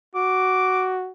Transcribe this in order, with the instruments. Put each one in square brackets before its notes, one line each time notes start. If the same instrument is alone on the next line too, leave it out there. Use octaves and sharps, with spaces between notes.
[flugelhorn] F#4 [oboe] D6